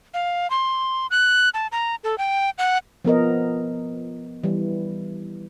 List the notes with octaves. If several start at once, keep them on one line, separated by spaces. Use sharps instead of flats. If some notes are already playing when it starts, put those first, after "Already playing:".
F5
C6
F#6
A5
A#5
A4
G5
F#5
F3 B3 A#4 D#5
E3 G3